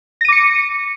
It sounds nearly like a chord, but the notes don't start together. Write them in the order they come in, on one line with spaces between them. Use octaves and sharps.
A#6 D#7 D6 C#7